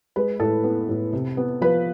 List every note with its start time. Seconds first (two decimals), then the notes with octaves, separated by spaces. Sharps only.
0.16 G#3 B4
0.40 A2 A4
0.64 B3
0.89 A2
1.13 C3
1.37 B3
1.61 F3 B4